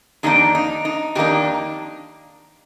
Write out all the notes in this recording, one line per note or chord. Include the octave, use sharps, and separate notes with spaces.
F2 D#3 A#3 D4 D#4 G4
D#4
D#4
F2 D#3 A#3 D4 D#4 G4